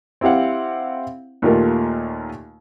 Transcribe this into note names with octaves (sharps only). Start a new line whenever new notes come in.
C4 E4 G4 F5 F#5
D#2 A#2 A3 F4 G4 A#4